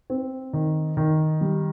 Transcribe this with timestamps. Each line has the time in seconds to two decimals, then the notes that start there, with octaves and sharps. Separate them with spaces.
0.10 C4
0.53 D#3
0.97 D#3
1.41 G3